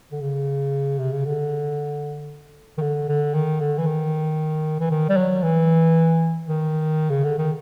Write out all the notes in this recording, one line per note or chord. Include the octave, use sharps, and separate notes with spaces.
D3
C#3
C3
C#3
D3
D#3
D3
D3
D#3
D3
E3
D#3
E3
D#3
G3
F#3
E3
D#3
C#3
D3
D#3